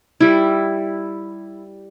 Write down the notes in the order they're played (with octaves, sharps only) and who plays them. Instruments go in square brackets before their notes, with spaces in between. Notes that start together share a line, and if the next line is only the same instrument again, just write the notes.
[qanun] G3 E4